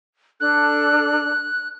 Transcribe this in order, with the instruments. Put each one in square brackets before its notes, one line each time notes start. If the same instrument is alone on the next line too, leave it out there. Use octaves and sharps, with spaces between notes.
[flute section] D4 A4 [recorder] F#6